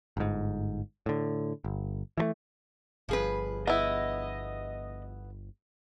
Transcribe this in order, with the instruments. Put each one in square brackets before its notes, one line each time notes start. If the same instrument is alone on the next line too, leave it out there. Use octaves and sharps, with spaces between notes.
[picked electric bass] G1 G#2
A2 D3
G1
E3 F3 A3
[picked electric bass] G1 [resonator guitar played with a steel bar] F3 G#4 B4
[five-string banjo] B3 E4 [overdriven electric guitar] D#5